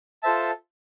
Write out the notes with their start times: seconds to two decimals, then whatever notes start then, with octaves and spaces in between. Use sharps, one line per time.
0.23 F4 A4 C5 E5 A5